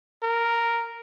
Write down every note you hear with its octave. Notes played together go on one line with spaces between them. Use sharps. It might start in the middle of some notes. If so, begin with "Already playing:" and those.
A#4